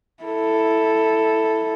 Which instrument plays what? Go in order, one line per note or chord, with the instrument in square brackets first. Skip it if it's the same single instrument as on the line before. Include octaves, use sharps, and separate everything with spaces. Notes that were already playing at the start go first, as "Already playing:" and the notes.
[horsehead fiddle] E4 A4